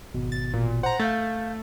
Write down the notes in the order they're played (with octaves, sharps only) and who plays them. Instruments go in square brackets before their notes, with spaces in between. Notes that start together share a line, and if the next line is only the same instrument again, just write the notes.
[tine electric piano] G#1 B2
[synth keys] A6
A#2
[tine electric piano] C5 [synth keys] F#5 A#5
[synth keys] A3 [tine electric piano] F5 G6 A6